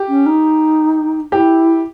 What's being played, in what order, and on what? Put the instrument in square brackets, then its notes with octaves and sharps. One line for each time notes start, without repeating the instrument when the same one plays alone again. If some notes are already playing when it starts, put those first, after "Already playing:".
Already playing: [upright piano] G4
[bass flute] C#4
D#4
[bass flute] E4 [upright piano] G4